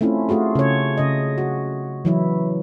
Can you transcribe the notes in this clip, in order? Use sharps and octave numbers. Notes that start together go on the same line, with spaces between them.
A3 C4 C#4 E4 F4
A3 F4 F#4 G#4
C#3 C#5
C#3 D#5
F#4
E3 F#3 E4